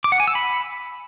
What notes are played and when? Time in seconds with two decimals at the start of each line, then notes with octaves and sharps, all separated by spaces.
0.04 D6
0.12 F#5
0.20 G#5
0.28 E6
0.35 B5